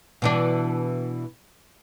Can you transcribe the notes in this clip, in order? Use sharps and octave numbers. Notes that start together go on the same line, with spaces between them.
B2 E3 D4